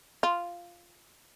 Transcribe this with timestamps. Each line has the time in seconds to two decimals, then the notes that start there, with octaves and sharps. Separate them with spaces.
0.23 F4